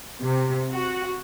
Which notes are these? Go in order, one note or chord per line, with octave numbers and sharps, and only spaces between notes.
C3
F#4